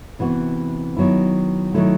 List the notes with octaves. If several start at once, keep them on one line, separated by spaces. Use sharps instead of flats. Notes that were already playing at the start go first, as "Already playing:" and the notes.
C3 E3 B3 F#4
D#3 F#3 B3 E4
D#3 F#3 A3 E4